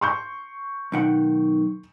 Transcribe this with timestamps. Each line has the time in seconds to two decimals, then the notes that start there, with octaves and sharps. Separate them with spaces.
0.01 C6 C#6 G6
0.92 B1 D#3 F#5